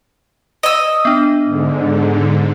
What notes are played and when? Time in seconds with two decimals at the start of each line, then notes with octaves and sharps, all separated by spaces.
0.63 D#5 E6
1.05 B3 D4
1.44 G#2 D3